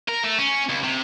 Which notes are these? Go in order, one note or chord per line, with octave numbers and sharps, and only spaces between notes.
A#4
A3
C#4
C#2
C3